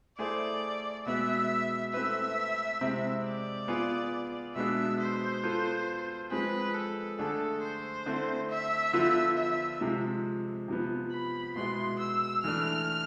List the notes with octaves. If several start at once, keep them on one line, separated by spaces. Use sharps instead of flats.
A3 E4 G#4 C5 D5
B2 G#3 B3 E5
A3 C4 E4 B4 E5
C3 G#3 C4 E4
D5
B3 F4 G#4
B2 G#3 B3 D4 E5
C5
B3 F4 A4
F3 G#3 C4 G#4 B4
A4
D3 A3 D4 G#4 A4
C5
D3 A3 C4 E4
E5
D3 F3 B3 F4
E5
C3 F3 G#3
C3 F3 B3
B5
B2 G#3 B3 E4 B4 C6
E6
E3 A3 D4 F6